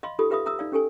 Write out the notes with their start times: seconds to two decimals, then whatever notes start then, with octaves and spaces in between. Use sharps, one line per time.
0.03 D#5 F5 B5 C6
0.19 D#4 F4 G4 A4 B5 D#6
0.30 G4 B4 E5 F5 B5 D#6
0.46 E5 A#5 D#6 E6
0.59 D#4 D5 F5
0.72 C#4 G4 A4 G#5